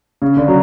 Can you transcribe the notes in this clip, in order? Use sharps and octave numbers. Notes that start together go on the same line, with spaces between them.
C#3
D3
F#3